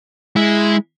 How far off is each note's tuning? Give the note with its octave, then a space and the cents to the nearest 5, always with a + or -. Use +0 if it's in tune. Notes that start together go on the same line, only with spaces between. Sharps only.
G#3 +0 E4 -5